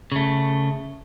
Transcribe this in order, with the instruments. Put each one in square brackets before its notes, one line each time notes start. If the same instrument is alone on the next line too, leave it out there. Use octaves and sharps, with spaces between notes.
[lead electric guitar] C#3 A3